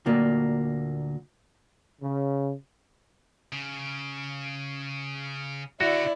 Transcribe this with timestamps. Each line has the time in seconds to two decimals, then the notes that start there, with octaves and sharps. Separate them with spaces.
0.06 D2 A#2 A#3 D5
2.02 C#3
3.52 C#3
5.81 D3 E4 F#4 D5